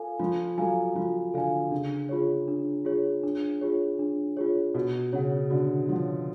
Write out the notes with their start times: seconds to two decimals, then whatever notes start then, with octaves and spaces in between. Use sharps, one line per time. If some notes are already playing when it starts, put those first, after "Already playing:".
Already playing: F4 A4 F5 G#5
0.19 F3 F4
0.58 F#3 A4 F5 G#5
0.95 F3 F4
1.34 D3 A4 F5 G#5
1.71 C#3 D4
2.09 F4 G#4 C#5
2.48 D4
2.85 F4 G#4 C#5
3.24 D4
3.61 F4 G#4 C#5
3.99 D4
4.37 F4 G#4 C#5
4.74 B2 F#4
5.13 C#3 C#5 F#5
5.50 D3 F#4
5.89 F3 C#5 F#5